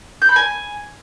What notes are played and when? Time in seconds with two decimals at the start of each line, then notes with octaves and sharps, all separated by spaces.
0.22 G6
0.29 B5
0.36 G#5